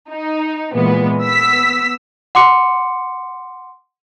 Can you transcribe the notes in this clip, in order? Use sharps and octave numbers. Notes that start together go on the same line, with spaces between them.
D#4
A#2 E3 G#3 B3
B3 E6 B6
F#5 C6 D6 C#7